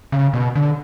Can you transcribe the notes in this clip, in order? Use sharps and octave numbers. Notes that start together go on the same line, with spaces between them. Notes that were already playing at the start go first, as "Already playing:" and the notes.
C#3
B2
D3